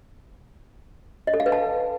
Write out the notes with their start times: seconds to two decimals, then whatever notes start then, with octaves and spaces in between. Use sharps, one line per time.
1.27 D#5
1.34 A4
1.40 F5
1.46 B4
1.52 A5